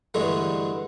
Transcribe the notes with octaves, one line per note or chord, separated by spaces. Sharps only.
G2 D3 E3 G#3 A3